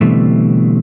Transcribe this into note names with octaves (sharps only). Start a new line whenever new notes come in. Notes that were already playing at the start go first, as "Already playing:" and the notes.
B2 D3 E3 G3 A3 C4